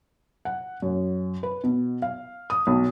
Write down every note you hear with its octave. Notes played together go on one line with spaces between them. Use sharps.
F#5
F#2
B4
B2
F5
D#6
B1